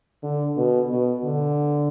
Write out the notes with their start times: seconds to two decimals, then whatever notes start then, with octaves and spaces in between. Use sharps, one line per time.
0.23 D3
0.56 B2
0.90 B2
1.24 D3